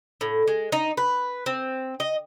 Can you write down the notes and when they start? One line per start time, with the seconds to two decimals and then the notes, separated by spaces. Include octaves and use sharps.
0.21 A2
0.48 G#3
0.72 D#4
0.97 B4
1.46 C4
2.00 D#5